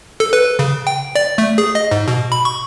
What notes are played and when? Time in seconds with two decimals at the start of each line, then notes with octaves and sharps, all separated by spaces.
0.20 A4
0.33 B4
0.59 C#3
0.87 G5
1.15 D5
1.38 A3
1.58 G#4
1.75 D#5
1.91 G#2
2.08 B2
2.32 B5
2.45 C#6